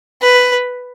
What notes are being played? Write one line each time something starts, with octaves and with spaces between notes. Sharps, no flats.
B4